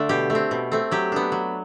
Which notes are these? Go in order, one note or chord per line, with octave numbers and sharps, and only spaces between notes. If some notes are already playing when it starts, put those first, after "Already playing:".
Already playing: D3 A3 D4
B2 G4
A3
C4
B2
A3 C4
F#3 G4
B3 D4
F#3